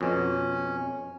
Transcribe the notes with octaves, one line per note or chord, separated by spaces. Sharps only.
F2 B2 C#4